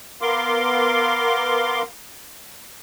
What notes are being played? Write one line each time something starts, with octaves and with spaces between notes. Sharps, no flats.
B3 A#4 F5 C6 D6